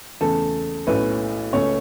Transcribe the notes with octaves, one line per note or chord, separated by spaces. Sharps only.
E2 C#3 A3 A4 A5
B1 A2 A3 C#4 B4
C#2 C#3 A3 C#4 C#5